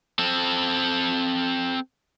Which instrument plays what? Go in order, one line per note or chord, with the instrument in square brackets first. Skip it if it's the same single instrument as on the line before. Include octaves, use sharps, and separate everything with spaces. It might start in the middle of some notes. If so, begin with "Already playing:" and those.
[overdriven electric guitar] C4 A4